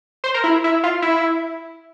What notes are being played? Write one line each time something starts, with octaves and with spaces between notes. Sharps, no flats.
C5
A#4
E4
E4
F4
E4